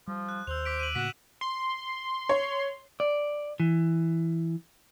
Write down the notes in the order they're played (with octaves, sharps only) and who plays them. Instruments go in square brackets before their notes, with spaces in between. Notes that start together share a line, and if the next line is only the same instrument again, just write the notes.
[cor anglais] F3 [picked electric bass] G3
[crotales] F#6
[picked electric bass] D#2 [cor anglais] C5 [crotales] E6 F7
[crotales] D6 B6 D7
D#7 F#7
[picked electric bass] A2 C#3 A#3 [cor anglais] F#4 [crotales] B6 E7
[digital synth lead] C6
[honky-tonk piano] C#5
[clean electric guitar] D5
E3